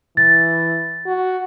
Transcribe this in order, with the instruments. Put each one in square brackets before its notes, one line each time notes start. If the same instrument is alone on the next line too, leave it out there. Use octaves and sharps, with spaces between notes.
[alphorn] E3 [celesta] A6
[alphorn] F#4